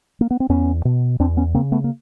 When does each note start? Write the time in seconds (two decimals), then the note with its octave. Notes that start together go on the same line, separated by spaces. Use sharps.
0.21 A#3
0.31 B3
0.40 C4
0.49 E2 B3 C#4
0.85 B2
1.20 E2 C4 D4
1.37 B3 C#4
1.54 C#3 A#3 C4
1.72 A3 B3
1.84 A#3